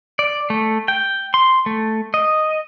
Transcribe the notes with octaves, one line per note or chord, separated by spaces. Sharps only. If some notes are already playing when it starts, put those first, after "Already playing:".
D5
A3
G5
C6
A3
D#5